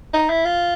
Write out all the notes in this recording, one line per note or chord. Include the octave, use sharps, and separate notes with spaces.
D#4
E4
F4